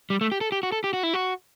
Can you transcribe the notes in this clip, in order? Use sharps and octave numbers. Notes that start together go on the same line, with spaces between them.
G3
A3
G4
A4
G4
F#4
A4
G4
F#4
E4
F#4